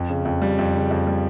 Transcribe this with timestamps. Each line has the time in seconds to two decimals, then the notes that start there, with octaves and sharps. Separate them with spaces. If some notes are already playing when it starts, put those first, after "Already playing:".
Already playing: F2
0.09 C#3
0.25 F2
0.42 G3
0.58 F2
0.74 C#3
0.91 F2
1.07 G3